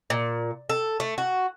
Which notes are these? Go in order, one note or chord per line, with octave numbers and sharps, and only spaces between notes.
A#2
A4
A3
F#4